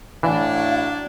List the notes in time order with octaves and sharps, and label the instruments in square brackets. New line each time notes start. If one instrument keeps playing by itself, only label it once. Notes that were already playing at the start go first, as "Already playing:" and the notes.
[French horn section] A2 [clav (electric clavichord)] E3 [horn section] F#3 D4 [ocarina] F5